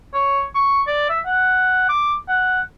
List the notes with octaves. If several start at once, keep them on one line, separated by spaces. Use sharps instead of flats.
C#5
C#6
D5
E5
F#5
D6
F#5